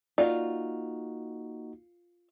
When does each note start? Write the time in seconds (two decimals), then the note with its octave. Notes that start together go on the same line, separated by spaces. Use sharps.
0.18 A#3 D#4 F4 F#4 D5